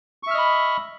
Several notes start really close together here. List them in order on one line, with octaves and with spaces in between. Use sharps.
C#6 E5 F6 D#5 B5